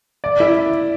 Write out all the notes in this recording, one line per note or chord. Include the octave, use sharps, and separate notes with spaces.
D5
E4